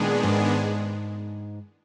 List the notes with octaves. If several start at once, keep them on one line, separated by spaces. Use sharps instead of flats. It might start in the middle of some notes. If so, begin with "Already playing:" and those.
Already playing: A#2 D#3 G#3 B3 D4 G#4
G#2